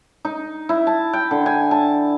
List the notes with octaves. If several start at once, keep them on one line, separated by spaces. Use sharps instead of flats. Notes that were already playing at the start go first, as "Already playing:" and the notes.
D#4
E4
A5
G5
D3
G#5
A5